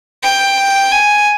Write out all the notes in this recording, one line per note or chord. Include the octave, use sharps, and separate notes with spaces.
G5
G#5